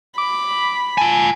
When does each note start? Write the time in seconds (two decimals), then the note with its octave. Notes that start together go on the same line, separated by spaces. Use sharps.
0.18 B5 D6
0.98 F4 G#5 A5